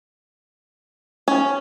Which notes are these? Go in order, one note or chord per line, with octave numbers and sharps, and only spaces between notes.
C#4